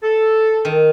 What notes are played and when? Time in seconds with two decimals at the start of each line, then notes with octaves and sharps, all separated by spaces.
0.03 A4
0.65 D#3